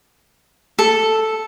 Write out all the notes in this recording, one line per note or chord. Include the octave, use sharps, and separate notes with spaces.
A4